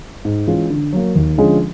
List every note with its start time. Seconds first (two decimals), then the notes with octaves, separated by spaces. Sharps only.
0.25 G#2
0.47 E3 G#3 C#4 F4
0.70 D3
0.92 F#3 A#3
1.15 D#2
1.38 D3 F3 G#3 C#4